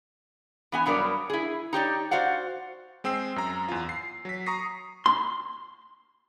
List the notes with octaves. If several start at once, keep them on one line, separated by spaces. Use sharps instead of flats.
E3 B3 G#5
G2 F#3 B3 A#4 D5
E4 G#4
D#4 G4 C#5 D5
F#4 C5 D5 F5 F#5
G#3 C4 G5 E6 C7
F#2 A#5
E2 F4
C7
F#3 B6
A#5 C#6 D#6 A#6 C7
C6